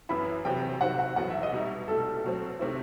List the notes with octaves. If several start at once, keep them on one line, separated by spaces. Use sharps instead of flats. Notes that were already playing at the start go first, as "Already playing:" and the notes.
F#2 E3 B3 E4 B5
E2 C3 F#3 C4 G5
C3 D#3 F#3 C4 F#5
F#5
E2 B2 F#3 F#5
E5
D#5
B2 G3 D#4 E5
C2 B2 A3 A4
B2 F#3 A3 C4
C3 D#3 A3 C4 E4